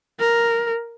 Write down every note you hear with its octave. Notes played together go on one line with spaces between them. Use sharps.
A#4